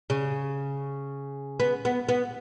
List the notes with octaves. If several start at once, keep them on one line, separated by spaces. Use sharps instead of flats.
C#3
B3
B3
B3